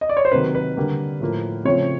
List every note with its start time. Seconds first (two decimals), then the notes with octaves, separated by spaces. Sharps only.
0.01 D#5
0.09 D5
0.17 C#5
0.25 C5
0.32 C3 D#3 F#3 A#3 B4
0.55 B4
0.77 D3 G3 A#3
1.20 A2 F3 A#3
1.65 C#3 F3 A3 C4 C#5